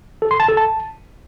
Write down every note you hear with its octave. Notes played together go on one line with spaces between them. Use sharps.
A4
C6
A5
A4
A5